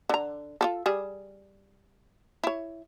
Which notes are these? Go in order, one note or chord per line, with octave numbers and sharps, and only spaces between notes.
D3 A#5
F4 G4 A4
G3 G#4
E4 C#5